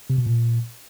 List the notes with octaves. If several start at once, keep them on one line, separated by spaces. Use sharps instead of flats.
C3
B2
A#2